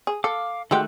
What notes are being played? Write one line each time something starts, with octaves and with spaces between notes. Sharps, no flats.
G#4
A4 F5 D6
D#3 G#3 A3 F#4 G4 F#6